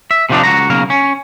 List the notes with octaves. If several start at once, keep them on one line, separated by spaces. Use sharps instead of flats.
E5
C3 D#3 F3 G#3 D4 D#4
C#2 F#4 A#5
B1 C#3 A#3 A#4
C#4